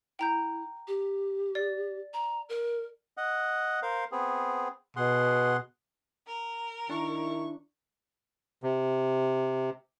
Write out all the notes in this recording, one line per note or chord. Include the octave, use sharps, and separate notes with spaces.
E4 G5 A#5 G6
G4
D5
A#5
A#4
D#5 F#5
A#4 C5 F5
B3 C4 G#4
B2 G#4 F#5 C6
A#4
D#3 D4 E4 C#6
C3